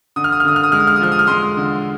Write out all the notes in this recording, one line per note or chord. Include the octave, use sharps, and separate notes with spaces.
D3 D#6
F6
D#6
F6
D3 D#6
F6
D#6
G#3 F6
D#6
F6
D#6
F3 F6
D#6
F6
G#3 C6 D#6
D3